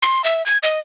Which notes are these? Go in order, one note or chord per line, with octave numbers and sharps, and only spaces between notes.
C6
E5
G#6
D#5